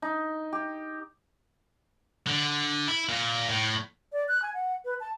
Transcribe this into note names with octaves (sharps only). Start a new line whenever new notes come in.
D#4
G4
D3
E4
A#2
A2
D5
F#6
G#5
F#5
B4
A5